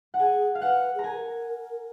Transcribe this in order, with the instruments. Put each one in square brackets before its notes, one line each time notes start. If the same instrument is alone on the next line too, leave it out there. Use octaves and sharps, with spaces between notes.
[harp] F#5
[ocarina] G#4 [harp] G#5
[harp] F5
[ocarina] B4 [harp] F#5
[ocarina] G#4 [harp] A#5
[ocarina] A#4 [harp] G#5